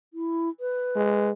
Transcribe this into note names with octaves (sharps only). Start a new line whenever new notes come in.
E4
B4
G#3